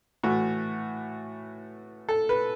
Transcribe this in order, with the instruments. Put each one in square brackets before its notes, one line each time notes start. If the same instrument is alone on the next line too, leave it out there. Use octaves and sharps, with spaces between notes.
[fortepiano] A2 E3 A3 F#4
A4
B4